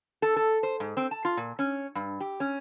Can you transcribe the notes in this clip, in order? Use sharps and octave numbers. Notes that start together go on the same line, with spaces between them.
A4
A4
C5
G#2
C4
A5
F4
A#2
C#4
G2
G4
C#4